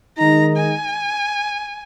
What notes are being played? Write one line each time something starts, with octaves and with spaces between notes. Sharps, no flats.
D#3 G#3 D#4 A#5
G#5